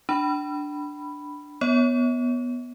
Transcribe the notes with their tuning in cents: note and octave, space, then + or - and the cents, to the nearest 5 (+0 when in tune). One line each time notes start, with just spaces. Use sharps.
D4 +0 B5 +0
B3 -5 C#5 +0